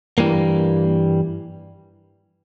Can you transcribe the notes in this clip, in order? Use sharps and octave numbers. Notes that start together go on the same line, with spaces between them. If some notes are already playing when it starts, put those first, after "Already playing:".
G2 E3 G3 A#3